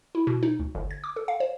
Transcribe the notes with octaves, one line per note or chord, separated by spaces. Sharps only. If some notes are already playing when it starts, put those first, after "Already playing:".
E4
B2
D#4
D2
G1
G#6
D6
A4
F5
C5